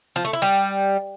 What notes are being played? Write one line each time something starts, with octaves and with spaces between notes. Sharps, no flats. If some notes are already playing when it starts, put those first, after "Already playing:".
F3
A3
E4
G3